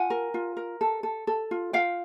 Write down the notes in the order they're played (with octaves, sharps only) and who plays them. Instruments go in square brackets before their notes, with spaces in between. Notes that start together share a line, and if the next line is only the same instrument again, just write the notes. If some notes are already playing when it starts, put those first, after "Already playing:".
Already playing: [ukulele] F4 F#5 G#5
A#4
F4
A#4
A4
A4
A4
F4
F4 F5 G5